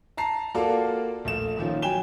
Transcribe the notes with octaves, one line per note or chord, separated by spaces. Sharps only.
A5 A#5 C7
A#3 F4 F#4 A4 D5
A#1 A3 E7
A#2 D#3 F3 C#4
F#3 G5 G#5 E7 G7